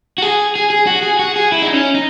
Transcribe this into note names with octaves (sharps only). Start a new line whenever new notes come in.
F#4
G#4
G#4
G#4
F#4
G#4
F#4
G#4
E4
D#4
C#4
D#4